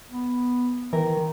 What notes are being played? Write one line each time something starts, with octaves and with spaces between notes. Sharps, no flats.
B3
D#3 E3 A#4